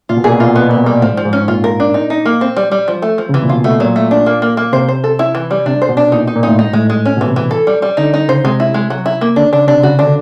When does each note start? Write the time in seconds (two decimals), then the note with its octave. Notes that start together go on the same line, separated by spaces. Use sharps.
0.09 A#2 F4
0.17 B2
0.24 A#2 G#4
0.32 B2
0.39 A#2 F4
0.47 B2
0.54 A#2 B3
0.62 B2
0.69 A#2 B3
0.76 B2
0.84 A#2 G3
1.01 A2 F3
1.13 G#2
1.17 F3
1.25 G#2
1.33 C#4
1.48 A#2 F4
1.64 A#4
1.80 D4
1.94 D#4
2.10 D#4
2.25 A#3
2.41 C4
2.57 G3
2.71 G3
2.88 F3
3.02 A3
3.18 F3
3.29 C#3
3.33 C3 E3
3.42 A#2
3.49 B2 F4
3.64 B2 A3
3.80 A#2 F#3
3.96 A3
4.11 D4
4.26 A#3
4.42 A#3
4.57 A#3
4.73 C3 C5
4.88 C5
5.04 A4
5.19 E4
5.35 E3
5.51 G3
5.66 C3 D4
5.82 C5
5.89 B2
5.97 D4
6.12 A#2 D#4
6.27 D#4
6.35 A#2
6.43 A2 D#4
6.59 G#2 D#4
6.73 A2 G#3
6.90 G#3
7.05 C#4
7.17 B2
7.21 E3
7.28 C3
7.36 E3
7.51 A4
7.67 G3
7.82 G3
7.97 D3 D#4
8.14 D#4
8.28 C#3 C5
8.44 C3 G#3
8.60 E4
8.74 G#3
8.90 F#3
9.06 E4
9.21 A#3
9.36 D3 D4
9.53 C#3 D4
9.67 C3 D4
9.83 C#3 F#4
9.99 D3 D4